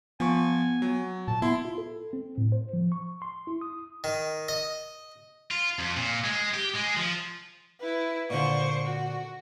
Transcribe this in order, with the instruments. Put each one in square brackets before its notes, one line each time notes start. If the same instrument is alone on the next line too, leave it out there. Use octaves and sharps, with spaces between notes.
[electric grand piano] F3 C#6 [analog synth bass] B3 [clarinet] G#5
[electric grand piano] F#3
[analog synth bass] A#2 [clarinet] A5
[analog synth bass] B3 [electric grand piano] E4 [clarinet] C6
[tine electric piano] F4
A4
C4
A2
C5
F3
C#6
C6
E4
D#6
[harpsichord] D#3
D#5
[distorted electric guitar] F4
F2
A#2
G#3
G4
G#3
F3
[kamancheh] E4 B4
[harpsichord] A#2 D3 [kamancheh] C5 C#6
[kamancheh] F#4